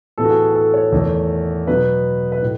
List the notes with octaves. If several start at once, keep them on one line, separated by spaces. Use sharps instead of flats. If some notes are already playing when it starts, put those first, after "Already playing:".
A2 E3 B3 A4
F#4
G#4
G#4
A4
C#5
E2 D#3 A3
B2 F#3 B3 B4
B4
A2